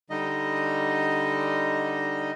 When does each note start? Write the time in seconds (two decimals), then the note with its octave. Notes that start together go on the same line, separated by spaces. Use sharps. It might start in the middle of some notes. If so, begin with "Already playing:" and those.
0.10 D3 G3 D#4 D#5